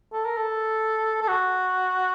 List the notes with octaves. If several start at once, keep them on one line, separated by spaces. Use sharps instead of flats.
A4
A#4
A4
A4
F#4